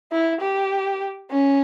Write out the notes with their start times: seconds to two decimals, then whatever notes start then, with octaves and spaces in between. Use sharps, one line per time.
0.12 E4
0.41 G4
1.30 C#4